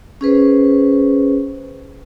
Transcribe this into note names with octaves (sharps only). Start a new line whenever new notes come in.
C#4 G#4 B4 C5